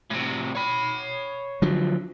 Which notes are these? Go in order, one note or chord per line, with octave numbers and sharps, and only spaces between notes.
A2 C3
C#5 B5
D3 F3 F#3